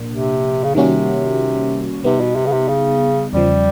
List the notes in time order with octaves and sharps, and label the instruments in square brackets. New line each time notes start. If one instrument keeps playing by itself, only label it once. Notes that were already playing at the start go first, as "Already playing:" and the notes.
Already playing: [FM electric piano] A#2 F3 A#3 D4
[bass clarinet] C3
C#3
[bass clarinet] C3 [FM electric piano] D#3 G3 A#3 C#4 F#4
[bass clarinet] C3 [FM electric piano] G3 B3 D#4
[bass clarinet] B2
C3
C#3
C3
C#3
[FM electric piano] E2 C#3 F3 [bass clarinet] G3